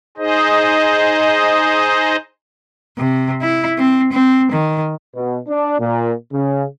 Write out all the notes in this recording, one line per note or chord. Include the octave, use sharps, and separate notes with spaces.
D#4 G#4 C5 D#5
C3
E4
C4
C4
D#3
B2
D4
A#2
C#3